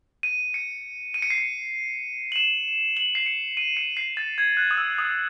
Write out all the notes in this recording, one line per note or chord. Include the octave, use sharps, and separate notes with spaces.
D#7
C#7
D#7
C#7
C7
C#7
F#7
E7
F#7
C7
C#7
D#7
C#7
C7
A6
G#6
F#6
D#6
E6
D#6